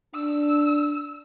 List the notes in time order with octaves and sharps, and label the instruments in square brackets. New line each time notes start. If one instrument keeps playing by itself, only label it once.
[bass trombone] D4 [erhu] E6